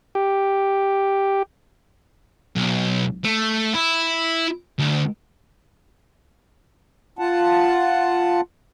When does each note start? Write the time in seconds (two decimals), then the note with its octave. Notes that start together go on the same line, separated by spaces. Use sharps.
0.15 G4
2.55 B1
3.24 A3
3.74 E4
4.79 D2
7.19 F4 F#5 A5